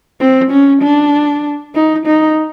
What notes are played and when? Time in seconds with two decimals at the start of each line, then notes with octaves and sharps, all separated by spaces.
0.20 C4
0.51 C#4
0.82 D4
1.75 D#4
2.06 D#4